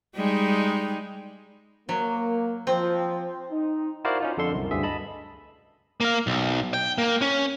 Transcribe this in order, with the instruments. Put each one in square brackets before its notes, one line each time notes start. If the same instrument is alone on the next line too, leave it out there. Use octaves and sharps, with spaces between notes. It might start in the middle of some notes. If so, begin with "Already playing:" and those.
[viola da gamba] G3 G#3 D#4
[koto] F#3 [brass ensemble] A#3
[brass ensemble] F3 [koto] C4
[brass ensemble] D#4
[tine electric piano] E4 F#4 A#4 C5 D5 F5
C#4 D#4 F4
F2 D3 A4 C6
C2 F#2
D2 G2 D3 G#4 E5
D#5 A5 B5
[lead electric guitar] A#3 F5
B1
G5
A#3
C#4